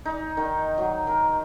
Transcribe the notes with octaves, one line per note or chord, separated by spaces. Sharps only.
D#4
D#3
F#3
A#4